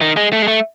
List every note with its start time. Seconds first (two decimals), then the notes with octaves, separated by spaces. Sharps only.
0.01 D#3
0.17 G#3
0.33 A3
0.42 G#3
0.48 A3